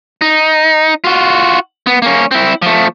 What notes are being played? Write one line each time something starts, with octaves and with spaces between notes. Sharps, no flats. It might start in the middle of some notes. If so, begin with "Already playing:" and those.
D#4
F4 F#4
B3
A#3 C#4
C4 E4
F3 A3